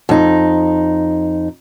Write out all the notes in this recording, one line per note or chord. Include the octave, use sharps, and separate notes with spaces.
F2 D#4